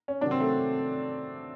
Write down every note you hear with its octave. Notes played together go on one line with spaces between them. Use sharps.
C#4
C3 D#3 F#3 D4
C4
A3